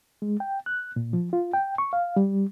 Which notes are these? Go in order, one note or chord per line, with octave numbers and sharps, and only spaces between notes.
G#3
G5
F#6
A#2
F3
F4
G5
C#6
F5
G3